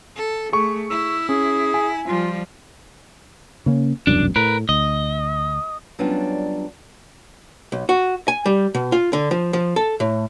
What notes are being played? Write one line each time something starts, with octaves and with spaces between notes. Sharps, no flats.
A4
A3 G#4 C#6
E4 E6
C#4 G#4
G#5
F3 G3 F4
C#3 A#3 C#4
E1 C2 F#2 D4
A2 A#4 B4
D2 D#5
F#3 G3 B3 C#4 D4 F4
B1
F#4
G#5
G3
B2
F4
D3
F3
F3
A4
A2